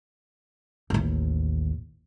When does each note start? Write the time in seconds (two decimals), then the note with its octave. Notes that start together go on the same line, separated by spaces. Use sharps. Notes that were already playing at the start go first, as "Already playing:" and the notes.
0.90 A1 D#2